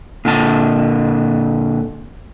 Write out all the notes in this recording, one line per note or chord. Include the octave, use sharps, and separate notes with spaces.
A#2 D3 A5